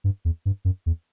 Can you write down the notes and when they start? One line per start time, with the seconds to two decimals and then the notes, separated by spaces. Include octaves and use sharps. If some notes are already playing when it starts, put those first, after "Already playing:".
0.04 G2
0.25 E2
0.45 G2
0.65 F#2
0.86 E2